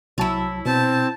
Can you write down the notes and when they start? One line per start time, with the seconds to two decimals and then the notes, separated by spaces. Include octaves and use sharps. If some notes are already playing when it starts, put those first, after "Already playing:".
0.18 C2 F#3 E4 C#5 A5
0.65 B2 C4 A5